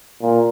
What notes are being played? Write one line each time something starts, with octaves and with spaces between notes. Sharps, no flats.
A#2